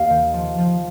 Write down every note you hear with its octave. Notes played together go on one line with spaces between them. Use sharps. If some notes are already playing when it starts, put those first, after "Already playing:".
Already playing: D#2 A#3 F5
D#3
F3
F3